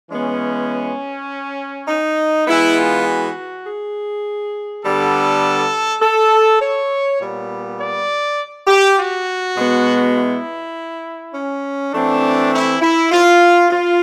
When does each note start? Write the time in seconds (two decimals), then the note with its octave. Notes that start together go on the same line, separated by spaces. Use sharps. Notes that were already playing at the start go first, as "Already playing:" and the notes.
0.10 E3 G#3 B3 C#4
1.88 D#4
2.46 E3 G#3 B3 E4
2.76 F4
3.06 F#4
3.65 G#4
4.83 D3 G3 B3 A4
6.01 A4
6.61 C#5
7.20 A#2 G3 B3
7.79 D5
8.67 G4
8.97 F#4
9.57 B2 G#3 B3
10.16 E4
11.34 C#4
11.92 E3 A3 C4 D4
12.53 E4
12.81 E4
13.12 F4
13.71 F4